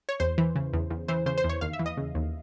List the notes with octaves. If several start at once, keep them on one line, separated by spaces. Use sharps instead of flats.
C#5
E2 C5
E3
C#3
E2
E2
E3 C5
C#3 C5
C5
E2
C#5
D#2 F5
E5
E3
D#5
C#3
D#2